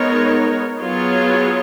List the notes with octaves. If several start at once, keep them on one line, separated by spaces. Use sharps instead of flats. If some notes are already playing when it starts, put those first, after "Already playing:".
Already playing: G#3 B3 D#4 A#4 C#5
F#3 B3 F4 G#4 C#5